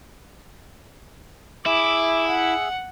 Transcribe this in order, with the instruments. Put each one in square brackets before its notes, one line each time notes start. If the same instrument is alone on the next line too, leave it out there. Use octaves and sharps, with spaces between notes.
[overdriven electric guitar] E4 [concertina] G#4 E5 [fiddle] D6
[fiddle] F#5